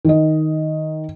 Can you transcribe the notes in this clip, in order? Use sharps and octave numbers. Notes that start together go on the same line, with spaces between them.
D#3 D#5